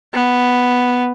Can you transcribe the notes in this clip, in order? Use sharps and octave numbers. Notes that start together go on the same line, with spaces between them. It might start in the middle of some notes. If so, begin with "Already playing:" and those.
B3